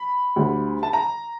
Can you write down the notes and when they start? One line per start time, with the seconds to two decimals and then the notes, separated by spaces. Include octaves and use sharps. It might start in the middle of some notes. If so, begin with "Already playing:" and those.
Already playing: B5
0.36 D2 D3 G3
0.83 A5
0.93 A#5